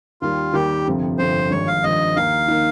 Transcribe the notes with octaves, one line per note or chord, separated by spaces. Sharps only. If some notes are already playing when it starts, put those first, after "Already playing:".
D#2 D#3 G3 F4
D#2 D#3 G3 G4
G1 F2 C3 F3
G1 F2 C3 F3 C5
G#1 G2 F3 C#5
F5
G#1 G2 F3 D#5
D#2 D#3 A#3 D#4 F5
D#3 A#3 D#4